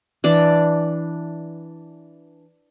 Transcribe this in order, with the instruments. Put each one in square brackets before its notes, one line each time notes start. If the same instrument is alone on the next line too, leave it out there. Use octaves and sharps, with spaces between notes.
[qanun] E3 D4 D5